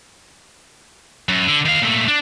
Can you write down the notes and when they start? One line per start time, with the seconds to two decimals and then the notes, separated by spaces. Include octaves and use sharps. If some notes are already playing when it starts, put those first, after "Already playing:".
1.29 F#2
1.47 D3
1.65 D#3 F5
1.81 A#2 A3
2.08 D4